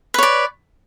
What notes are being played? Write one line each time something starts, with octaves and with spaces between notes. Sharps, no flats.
B4 C#5 D5